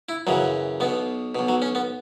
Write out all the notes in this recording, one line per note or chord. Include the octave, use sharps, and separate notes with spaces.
E4
F#2 C#3 E3 F#3
B1 B2 B3
B1 B2
F#3
C#4
B3